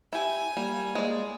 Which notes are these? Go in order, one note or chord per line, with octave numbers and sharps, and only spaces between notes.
E4 G4 G#5
G3 A#3
G#3 D5